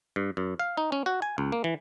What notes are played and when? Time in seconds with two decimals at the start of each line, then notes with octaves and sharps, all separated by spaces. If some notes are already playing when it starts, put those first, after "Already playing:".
0.16 G2
0.37 F#2
0.60 F5
0.77 D#4
0.92 C#4
1.06 F#4
1.22 G#5
1.38 C#2
1.52 A#3
1.64 E3